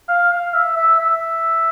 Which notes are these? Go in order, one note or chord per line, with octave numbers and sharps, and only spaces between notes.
F5
F5
E5
E5
E5